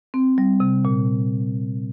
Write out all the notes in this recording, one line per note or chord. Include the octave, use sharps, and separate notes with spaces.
C4
G3
C3
A#2